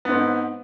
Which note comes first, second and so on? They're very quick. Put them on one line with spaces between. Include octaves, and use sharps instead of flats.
B3 G#2 C4